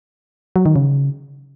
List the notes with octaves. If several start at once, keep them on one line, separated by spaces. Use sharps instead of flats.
F#3
D#3
C#3